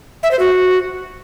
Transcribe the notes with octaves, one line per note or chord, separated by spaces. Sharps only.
E5
C5
F#4